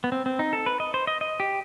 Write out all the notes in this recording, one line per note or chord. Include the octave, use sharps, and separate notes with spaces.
B3
C4
C4
D#4
A4
B4
D#5
C5
D#5
D#5
G4